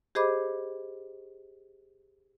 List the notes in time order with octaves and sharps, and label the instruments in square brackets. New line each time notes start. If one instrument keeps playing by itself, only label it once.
[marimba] G4 G#4 C5 D#5 B5 D6